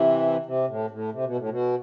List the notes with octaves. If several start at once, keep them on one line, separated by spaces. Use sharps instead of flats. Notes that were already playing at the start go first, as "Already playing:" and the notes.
Already playing: C3 E3
C3
A2
A2
C3
B2
A2
B2